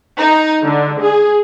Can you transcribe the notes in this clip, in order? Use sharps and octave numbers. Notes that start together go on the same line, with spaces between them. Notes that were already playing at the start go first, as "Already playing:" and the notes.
D#4
D3
G#4